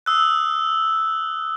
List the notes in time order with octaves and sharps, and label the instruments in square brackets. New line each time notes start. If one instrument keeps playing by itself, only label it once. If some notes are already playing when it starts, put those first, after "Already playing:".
[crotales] D#6 E6 F#6